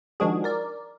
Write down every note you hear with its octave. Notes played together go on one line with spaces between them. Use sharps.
D#3 F3 G#3 D4 F#4 G#4
A#4 D5